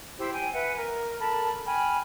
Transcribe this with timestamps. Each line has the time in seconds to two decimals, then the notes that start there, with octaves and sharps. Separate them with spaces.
0.18 E4 G4 C5 E6
0.33 G5 G#5
0.53 B4 E5 F#5 G#5
0.76 A#4
1.19 A4 A#4 A5 B5
1.65 G5 G#5 B5 F6